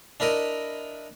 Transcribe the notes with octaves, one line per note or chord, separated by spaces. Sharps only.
D4 E4 A#4 D#5